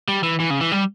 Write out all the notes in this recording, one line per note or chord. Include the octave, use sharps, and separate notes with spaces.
G3
E3
E3
C#3
E3
G3